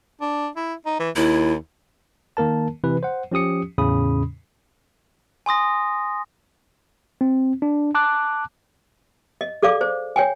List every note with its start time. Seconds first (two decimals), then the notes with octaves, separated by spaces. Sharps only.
0.21 D4
0.56 E4
0.86 D#4
1.00 E3
1.16 D#2 E4
2.37 D#3 A#3 A#4 A5
2.84 C3 E3 B4
3.03 C5 F#5
3.32 F3 C#4 G4 D#6 C#7
3.78 E2 A2 C#3 C#4 B5 D#6
5.46 G#5 C6 D#6 A#6
7.21 C4
7.62 D4
7.95 A5 D6 F#6
9.41 D#5
9.62 G#4 A4 D5 F5 D6
9.81 C5
10.16 C#5 G5 G#5